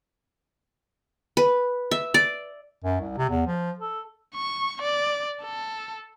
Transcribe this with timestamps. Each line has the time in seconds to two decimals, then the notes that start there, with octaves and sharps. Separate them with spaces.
1.37 B4
1.91 E5
2.14 D5
2.84 F#2
3.00 C2
3.18 C3
3.30 E2
3.47 F3
3.79 A4
4.35 C#6
4.82 D5
5.43 A4